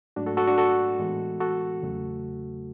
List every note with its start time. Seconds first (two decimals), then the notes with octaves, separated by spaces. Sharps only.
0.16 G#2 F#3 A3 D4 F#4
0.26 F#4 A4
0.37 F#4 A4
0.47 D4 F#4
0.58 F#4 A4
1.00 A2 E3 G#3 B3
1.40 F#4 A4
1.82 E2 C#3 F#3 A3